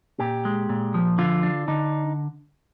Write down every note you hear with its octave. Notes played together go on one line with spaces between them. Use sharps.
A#2 G4
G#3
A#2
F3
D3 F4
D4
D3 D#4